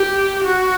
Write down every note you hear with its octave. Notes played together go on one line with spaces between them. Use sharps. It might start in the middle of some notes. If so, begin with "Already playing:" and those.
Already playing: G4
F#4